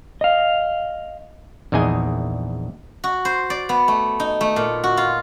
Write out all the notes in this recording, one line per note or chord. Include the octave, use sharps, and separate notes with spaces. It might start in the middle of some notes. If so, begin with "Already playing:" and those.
D#5 F5
A#1 E2 D#4 G#4 G#5
F#4
C5
D5
B3
A3
D#4
A3
A#2
F#4
F4